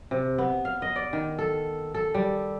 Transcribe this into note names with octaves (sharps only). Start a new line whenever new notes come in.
C3
B3
F5
D#5
D5
D#3
A4
A4
G3